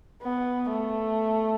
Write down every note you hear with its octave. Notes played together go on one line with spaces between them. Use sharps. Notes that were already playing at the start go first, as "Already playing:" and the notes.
B3
A3